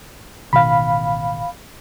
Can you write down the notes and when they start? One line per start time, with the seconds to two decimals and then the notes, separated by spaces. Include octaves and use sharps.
0.53 A1 B2 D#3 F5 B5